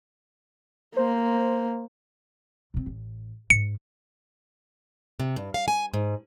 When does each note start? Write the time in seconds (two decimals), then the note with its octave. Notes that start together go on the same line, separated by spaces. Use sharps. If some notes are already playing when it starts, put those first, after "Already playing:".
0.97 A#3 C5
2.74 B2 C4
2.86 A1
3.50 G#2 C#7
5.20 C3
5.36 G2
5.54 F5
5.68 G#5
5.94 G#2